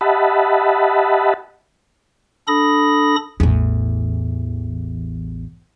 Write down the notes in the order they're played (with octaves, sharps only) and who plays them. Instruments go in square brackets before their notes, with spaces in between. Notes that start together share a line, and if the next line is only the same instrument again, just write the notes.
[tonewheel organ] G4 D#5 E5 F#5 A5 B5
[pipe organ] D4 A4 B5 D#6 A#6
[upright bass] A1 E2